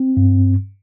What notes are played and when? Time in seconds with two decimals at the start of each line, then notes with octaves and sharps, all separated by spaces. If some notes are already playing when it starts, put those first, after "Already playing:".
Already playing: C4
0.17 G2